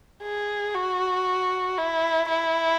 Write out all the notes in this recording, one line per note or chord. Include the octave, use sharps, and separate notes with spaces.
G#4
F#4
E4
E4